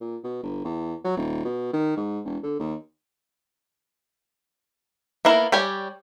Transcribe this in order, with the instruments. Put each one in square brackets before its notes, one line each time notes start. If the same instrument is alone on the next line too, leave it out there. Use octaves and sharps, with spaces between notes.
[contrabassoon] A#2
B2
G1
E2
F#3
D#1
B2
D#3
G#2
E1
D3
D#2
[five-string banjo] A#3 B3 E4 A#4
G3 G4 C#5 G#5